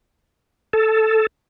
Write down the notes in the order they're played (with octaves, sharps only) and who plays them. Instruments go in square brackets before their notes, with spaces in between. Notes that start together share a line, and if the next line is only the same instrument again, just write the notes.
[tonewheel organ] A4